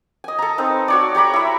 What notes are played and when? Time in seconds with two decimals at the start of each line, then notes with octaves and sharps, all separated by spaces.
0.24 D#5 G#5
0.39 A4 A#5
0.58 C4 D#4 B4
0.88 F#4 C#5 D5
1.15 G4 C#5 A#5 B5
1.34 E4 E5